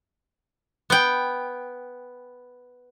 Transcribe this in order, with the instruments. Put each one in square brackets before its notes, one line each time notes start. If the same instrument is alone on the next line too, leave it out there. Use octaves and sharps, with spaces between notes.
[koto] B3 G5